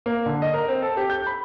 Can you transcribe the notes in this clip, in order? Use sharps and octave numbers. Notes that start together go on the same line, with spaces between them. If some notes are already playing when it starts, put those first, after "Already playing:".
A#3
D3
D#5
A#4
C4
A4
G4
G6
B5